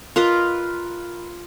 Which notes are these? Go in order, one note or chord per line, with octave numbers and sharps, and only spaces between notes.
F4 A#4 B4 D#5